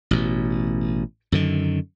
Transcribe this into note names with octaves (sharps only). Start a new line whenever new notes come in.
A1 B2
F#2 D3 D#3